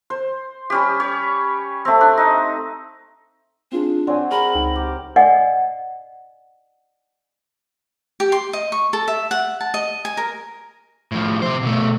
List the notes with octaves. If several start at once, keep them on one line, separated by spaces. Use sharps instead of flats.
C5
G3 C#4 G4
C#5
A3 C4
D4
D#4
C4 D4 F4 G#4
F#3 C4 D5 G#5
G#4 A#4 B5
C#2 D#4 G5
G4
D5 D#5 F#5 G#5
G4
C6
D#5
C#6
A4
E5
F#5
A5
D#5
G#5
A#4
A2 F3
C3 C5
B2 A3